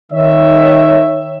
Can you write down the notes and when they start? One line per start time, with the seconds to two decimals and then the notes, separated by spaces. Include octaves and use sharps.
0.12 D#3 C#5 E5